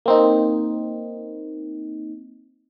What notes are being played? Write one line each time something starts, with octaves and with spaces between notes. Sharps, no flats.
A#3 C4 D#4